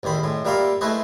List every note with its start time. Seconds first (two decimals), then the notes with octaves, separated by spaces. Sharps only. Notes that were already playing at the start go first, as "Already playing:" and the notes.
0.03 A1 E2 D#3 C5 B5
0.23 A2 G#3
0.45 A#2 G3 E5 F5 A#5 C6
0.81 A3 E4 G#4 B4 C5 D#5